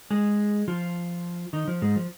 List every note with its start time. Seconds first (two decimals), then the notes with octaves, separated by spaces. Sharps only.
0.10 G#3 G#4
0.68 F3 F4
1.53 D#3 D#4
1.68 F3
1.82 G#2 G#3
1.96 F3